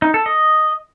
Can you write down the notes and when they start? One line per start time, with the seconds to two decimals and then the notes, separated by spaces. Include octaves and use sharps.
0.02 D#4
0.14 A4
0.26 D#5